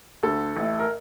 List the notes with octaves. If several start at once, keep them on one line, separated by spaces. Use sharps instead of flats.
D2 D3 A4
A1 A2
A#4